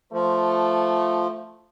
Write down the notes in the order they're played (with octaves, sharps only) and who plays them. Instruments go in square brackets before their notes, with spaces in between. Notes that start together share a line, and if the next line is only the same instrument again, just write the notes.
[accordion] F3 [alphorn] A3